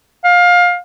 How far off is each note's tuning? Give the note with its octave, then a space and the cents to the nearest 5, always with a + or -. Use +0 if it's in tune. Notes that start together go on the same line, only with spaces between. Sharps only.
F5 +25